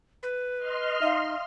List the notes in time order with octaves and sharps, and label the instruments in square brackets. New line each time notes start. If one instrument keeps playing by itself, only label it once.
[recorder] B4
[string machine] D#5 C6 F6
[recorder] D#4 [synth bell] E5 F5